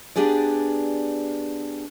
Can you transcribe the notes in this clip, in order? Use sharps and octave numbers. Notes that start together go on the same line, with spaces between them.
B3 D4 G4 G#4 D5